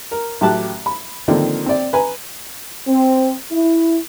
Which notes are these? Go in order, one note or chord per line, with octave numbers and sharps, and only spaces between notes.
A#4
A1 F#3 G4 A5 F#6
B5
D3 D#3 F3 A#3 C4 D4
C4 D5
B4 G#5 A#5
C4
E4